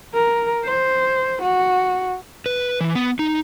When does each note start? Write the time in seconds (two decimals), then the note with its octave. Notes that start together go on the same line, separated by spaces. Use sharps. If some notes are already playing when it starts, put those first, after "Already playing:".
0.14 A#4
0.65 C5
1.42 F#4
2.46 B4
2.81 E3
2.95 B3
3.19 D#4